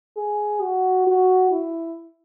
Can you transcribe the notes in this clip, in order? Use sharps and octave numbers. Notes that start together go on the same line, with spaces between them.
G#4
F#4
F#4
E4